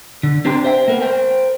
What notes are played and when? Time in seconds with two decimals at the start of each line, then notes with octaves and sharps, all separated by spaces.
0.23 D3
0.45 C4 D4 G4 G5 C6
0.64 C5 E5 G5
0.88 A#3 B3 A#4
1.02 A#4 C5 G5